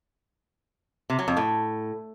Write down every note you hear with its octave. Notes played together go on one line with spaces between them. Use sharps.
C3
F#3
F2
A2